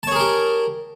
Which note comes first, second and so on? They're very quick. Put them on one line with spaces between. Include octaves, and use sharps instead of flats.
A5 C#5 G#4 A#4 G4